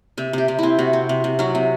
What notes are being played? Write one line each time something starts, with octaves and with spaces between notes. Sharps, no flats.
C3 E5
C3 G4
C3
C4 E4
C3 F#4
C4
C3
C3
F#3 F#4
C3